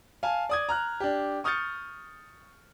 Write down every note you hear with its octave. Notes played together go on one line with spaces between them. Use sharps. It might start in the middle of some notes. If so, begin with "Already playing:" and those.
F5 G#5 A5
D5 D#6 G#6
A#5 F6 F#6
D4 G4
C#6 D#6 F6 G6 A6 C#7